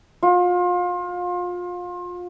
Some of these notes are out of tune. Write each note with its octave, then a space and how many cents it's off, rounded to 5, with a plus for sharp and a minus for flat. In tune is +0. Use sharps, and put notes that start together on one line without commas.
F4 +30